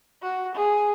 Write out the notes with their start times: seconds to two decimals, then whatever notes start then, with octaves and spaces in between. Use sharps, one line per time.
0.22 F#4
0.55 G#4